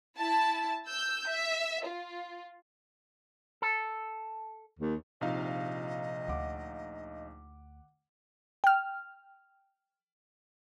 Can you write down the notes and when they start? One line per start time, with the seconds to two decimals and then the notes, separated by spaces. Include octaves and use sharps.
0.18 E4 A5
0.87 E6 G6
1.27 E5
1.85 F4
3.62 A4
4.79 D#2
5.21 A#1 C3 F3 D#4 D#5 F5
6.28 D2 F#5 D6
8.64 G5 F6